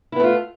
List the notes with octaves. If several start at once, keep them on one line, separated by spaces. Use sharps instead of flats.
A3 B3 E4 F4